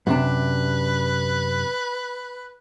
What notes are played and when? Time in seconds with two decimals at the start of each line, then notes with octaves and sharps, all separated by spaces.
0.07 F#2 C3 D4 B4